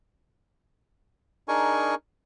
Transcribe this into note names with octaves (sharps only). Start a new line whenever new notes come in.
D4 D#4 G#4 A#4 G#5 C#6